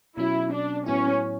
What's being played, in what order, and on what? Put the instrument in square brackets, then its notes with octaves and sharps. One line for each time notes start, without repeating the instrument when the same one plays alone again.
[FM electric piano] B2 F#3 C#4 [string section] E4
[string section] D4
[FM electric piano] A2 F#3 B3 E4 [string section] C#4